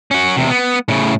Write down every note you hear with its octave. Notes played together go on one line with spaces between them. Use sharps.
C#4 F#4
E2 C3
B3
A2 C#3